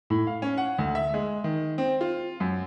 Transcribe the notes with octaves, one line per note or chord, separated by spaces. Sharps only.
A2
F5
C#4
F#5
D2
E5
G#3
D#3
C4
F4
F#2